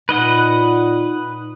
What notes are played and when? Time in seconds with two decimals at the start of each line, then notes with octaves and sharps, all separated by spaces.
0.09 A#2 D#4 B4 D#5 F#5